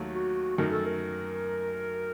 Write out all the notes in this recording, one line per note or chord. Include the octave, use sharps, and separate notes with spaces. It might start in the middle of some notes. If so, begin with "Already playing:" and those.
Already playing: D#2 D#3 F#3 A3
F#4
F#2 D#3 A3 A#4
A4
A#4